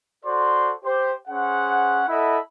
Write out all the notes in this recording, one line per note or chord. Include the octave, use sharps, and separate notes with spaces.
F#4 A4 C5 D5 C6
G4 C5
C#4 G#4 C5 F#5
E4 A4 D#5 E5 F#5 B5